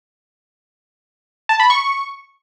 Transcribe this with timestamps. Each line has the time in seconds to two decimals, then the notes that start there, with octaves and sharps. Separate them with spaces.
1.49 A5
1.60 B5
1.70 C#6